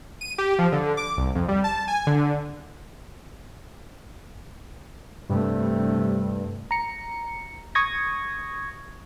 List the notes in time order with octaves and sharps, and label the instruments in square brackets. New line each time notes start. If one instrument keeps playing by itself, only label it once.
[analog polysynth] D#7
G4
F3
D3
D6
C2
F2
G3
A5
G#5
D3
[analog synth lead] G2 [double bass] C3 A3
[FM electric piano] A#5 C#7
C#6 D#6 G#6 A#6